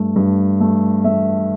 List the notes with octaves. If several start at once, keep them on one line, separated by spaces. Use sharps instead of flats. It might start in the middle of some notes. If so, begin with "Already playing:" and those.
Already playing: G2 A3
G2
A3
A3 E5